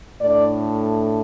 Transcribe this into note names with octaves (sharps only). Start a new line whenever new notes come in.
A2 A3 D4 D5